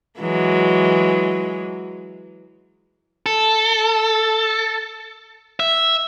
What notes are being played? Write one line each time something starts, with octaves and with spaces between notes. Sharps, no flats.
E3 F#3 G#3
A4
E5